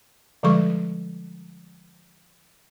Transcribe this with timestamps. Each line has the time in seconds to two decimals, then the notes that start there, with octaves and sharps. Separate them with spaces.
0.43 D3 F3 G3 G#3 A4 C#6